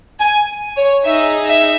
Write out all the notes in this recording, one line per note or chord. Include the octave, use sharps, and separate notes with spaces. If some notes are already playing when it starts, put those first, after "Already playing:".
G#5
C#5
D#4 G#4 E5
E5